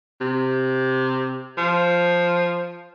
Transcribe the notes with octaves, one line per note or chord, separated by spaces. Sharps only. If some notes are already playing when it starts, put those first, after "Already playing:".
C3
F3